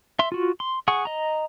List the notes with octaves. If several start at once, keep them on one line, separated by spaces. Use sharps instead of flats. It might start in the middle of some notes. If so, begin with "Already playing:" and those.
E5 C6
F4 F#4
C6
G#4 F#5 C#6
D#5 A#5